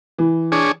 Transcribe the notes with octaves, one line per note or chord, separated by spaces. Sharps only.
E3
D4 G#4 C#5